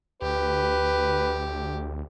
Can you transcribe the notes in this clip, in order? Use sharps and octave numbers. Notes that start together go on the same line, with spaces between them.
D2 G4 B4